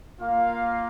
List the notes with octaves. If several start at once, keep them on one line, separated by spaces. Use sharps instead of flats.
A#3 F4 F5